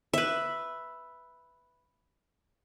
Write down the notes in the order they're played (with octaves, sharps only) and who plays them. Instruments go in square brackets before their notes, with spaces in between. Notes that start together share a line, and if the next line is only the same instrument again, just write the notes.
[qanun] B4 E5